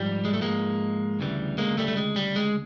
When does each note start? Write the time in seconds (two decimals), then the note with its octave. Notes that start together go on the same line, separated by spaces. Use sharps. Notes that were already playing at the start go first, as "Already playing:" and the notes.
Already playing: G#2 F3 G3
0.25 G#3
0.34 A3
0.42 G#3 A#3
1.20 D2 C#3 E3 G3
1.58 G#3 A#3
1.78 G3 A3
1.88 A3
1.97 G#3
2.16 G3
2.36 G#3